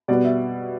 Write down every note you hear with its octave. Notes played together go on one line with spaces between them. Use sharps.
B2 G3 B3 D5
E5